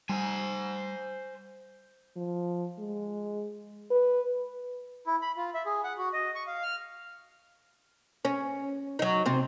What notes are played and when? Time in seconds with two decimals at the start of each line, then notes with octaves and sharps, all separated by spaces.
0.09 G3 C5 G#5
2.16 F3
2.79 G#3
3.91 B4
5.07 E4
5.22 B5
5.37 F4
5.54 E5
5.66 G#4
5.84 F#5
5.98 F#4
6.13 D#5
6.35 C#6
6.47 F5
6.63 F6
8.25 C#4
8.99 F#3 D#4
9.26 C3 C4